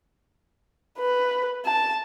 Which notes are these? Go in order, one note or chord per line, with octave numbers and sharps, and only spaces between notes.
B4
A5